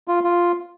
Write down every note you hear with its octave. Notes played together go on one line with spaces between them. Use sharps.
F4
F4